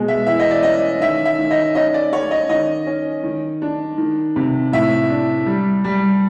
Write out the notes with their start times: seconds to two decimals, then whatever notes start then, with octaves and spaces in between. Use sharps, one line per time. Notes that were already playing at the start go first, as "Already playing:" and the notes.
Already playing: B2 G#3
0.08 E5
0.26 E3 E5
0.39 D#5
0.51 D5
0.63 C#4 D#5
1.00 D#3 E5
1.25 E5
1.38 D#3
1.51 D#5
1.75 C#4 D#5
1.94 D5
2.12 C#4 C#5
2.31 D#5
2.49 D#3 D#5
2.87 C#4
3.23 D#3
3.62 D4
3.98 D#3
4.36 C3
4.72 A2 E5
5.10 D4
5.46 G3
5.84 G3